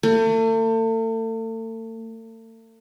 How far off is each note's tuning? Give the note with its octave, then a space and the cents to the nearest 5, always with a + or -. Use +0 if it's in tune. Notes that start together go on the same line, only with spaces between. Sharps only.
A3 +40